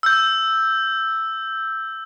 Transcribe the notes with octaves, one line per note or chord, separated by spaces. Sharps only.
E6 G6